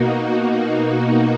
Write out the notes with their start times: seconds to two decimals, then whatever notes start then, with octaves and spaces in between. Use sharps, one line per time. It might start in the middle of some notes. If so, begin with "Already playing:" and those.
Already playing: B2 A#3 D#4 F#4
0.45 D#4 F#4